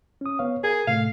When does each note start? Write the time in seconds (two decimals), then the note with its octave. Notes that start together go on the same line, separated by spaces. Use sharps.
0.21 C#4 D#6
0.39 B3 C#5 F5
0.64 G#4 A#4
0.87 A2 C3 A3 F5